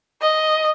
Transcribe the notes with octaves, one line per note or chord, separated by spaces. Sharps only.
D#5